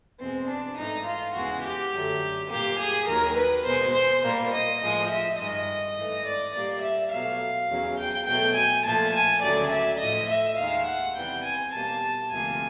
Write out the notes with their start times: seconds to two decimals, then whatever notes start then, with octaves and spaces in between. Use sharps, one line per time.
0.20 E2 B2 G#3 C4
0.49 D4
0.77 G#2 E3 A3 D#4
1.06 F4
1.34 E2 C#3 E3 G#3 F#4
1.63 G4
1.92 F#2 D3 F#3 A3
2.50 A#2 G3 A#3 G4
2.80 G#4
3.08 D#2 D#3 F#3 A#4
3.37 B4
3.66 B2 G#3 C5
3.94 C5
4.24 A#2 G3 A#3
4.52 D#5
4.81 A2 F3 G#3 D#5
5.10 E5
5.38 G2 D#3 G#3 D#5
5.96 G#2 E3 A3
6.25 D5
6.55 A#2 G3 A#3 D5
6.83 E5
7.12 B2 F#3 A3 F5
7.70 E2 C#3 F#3
7.99 G5
8.27 B2 F#3 A3 G5
8.56 G#5
8.85 A#2 F3 A3 A5
9.14 G#5
9.43 D2 C#3 F#3 A3 D5
9.72 E5
10.00 A2 F3 A3 D#5
10.30 E5
10.58 D#2 D#3 G#3 F5
10.87 F#5
11.16 E2 C3 E3 G3 G5
11.45 G#5
11.74 B2 G3 A#3 A5
12.31 D2 C3 F3 A#3 G#5